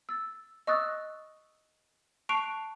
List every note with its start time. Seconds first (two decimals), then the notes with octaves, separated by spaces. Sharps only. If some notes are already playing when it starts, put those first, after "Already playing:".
0.09 E6 A6
0.67 D#5 C#6 D#6 E6 F#6 A6
2.29 A5 C#6 F#6 C7 D7 F7